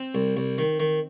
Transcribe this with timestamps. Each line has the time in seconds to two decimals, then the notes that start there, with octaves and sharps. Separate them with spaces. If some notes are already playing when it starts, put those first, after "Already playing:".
Already playing: C4
0.15 C2
0.37 C2
0.58 D#3
0.80 D#3